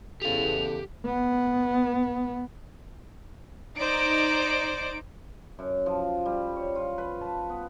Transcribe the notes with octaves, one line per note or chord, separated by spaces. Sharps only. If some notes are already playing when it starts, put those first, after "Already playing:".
E2 C#3 G4 A4 F5 F7
B3
D#4 C5 D5 D7
F#2
F3
G3
C#5
F4
B4
A5
B3